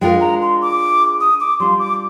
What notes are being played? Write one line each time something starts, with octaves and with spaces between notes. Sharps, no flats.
G#3 D4 F4 A#4 G5
A#5
C6
D6
D#6
D6
G3 D4 F4 C6
D6